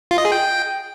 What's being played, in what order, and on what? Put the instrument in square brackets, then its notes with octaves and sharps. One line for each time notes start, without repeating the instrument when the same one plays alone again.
[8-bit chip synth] F4
D#5
G#4
G5